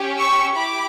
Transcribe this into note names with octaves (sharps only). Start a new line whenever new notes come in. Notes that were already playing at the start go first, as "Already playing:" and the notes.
Already playing: C#4 G4
C#6 E6
E4 G4 B5 D6